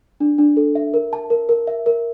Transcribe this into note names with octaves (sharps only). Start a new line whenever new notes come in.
D4
D4
A4
E5
A#4
A5
A#4
A#4
E5
A#4